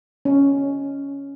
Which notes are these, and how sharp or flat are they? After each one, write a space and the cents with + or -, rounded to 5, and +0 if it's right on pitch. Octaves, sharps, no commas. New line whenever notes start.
C#4 +5